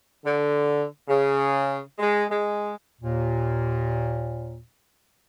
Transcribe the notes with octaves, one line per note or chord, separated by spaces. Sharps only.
D3
C#3
G#3
G#3
D#2 A#2